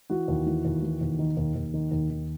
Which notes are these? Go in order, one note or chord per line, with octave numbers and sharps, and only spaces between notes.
E3 F#4
D#2
E3
D#2
E3
D#2
D#3
D#2
D#2
D#3
D#2
D#3